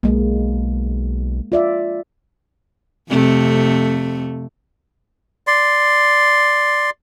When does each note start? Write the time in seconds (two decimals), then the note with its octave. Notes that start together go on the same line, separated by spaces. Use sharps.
0.03 B1 G#3 A#3
1.52 F4 D5 E5
3.10 F2 C3 A3
5.47 D5 C6